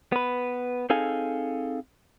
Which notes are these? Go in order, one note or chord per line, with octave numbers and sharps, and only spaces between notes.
B3 B4
C4 D#4 G#4 A4 F5 G#5